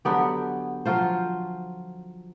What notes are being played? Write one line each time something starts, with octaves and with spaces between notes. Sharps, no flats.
D3 F#3 B3 G4
F3 F#3 F4 C5